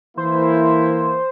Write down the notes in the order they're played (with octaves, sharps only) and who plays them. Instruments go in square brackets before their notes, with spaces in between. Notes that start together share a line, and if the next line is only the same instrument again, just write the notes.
[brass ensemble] E3 A#3 E4 [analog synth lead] C5